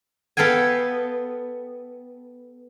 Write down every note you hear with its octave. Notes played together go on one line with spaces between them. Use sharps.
B3 A4 F5 G5 G#5